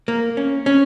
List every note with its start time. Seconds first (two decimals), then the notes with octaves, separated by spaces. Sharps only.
0.08 A#3
0.37 C#4
0.66 C#4